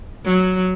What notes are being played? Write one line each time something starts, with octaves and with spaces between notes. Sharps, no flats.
F#3